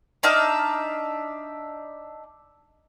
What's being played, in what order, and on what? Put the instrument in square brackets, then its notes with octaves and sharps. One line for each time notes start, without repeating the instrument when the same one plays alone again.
[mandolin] D4 D#4 E5 F5